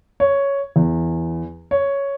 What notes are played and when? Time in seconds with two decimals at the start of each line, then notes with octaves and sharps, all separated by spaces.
0.20 C#5
0.76 E2
1.71 C#5